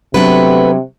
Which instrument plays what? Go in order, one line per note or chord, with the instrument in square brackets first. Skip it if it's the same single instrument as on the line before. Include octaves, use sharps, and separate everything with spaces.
[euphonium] C3 [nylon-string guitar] F#3 D4 [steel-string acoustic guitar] A3 B3 B4